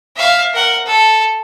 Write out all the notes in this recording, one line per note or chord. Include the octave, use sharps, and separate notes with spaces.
E5 F5
A#4 F#5
A4